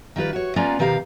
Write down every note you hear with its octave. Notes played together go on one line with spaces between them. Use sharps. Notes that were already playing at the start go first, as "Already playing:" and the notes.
D#3 G3 F4 B4
F#4 C#5
A#3 B3 C#4 F4 D5 A#5
B2 D#3 G4 F5 A#5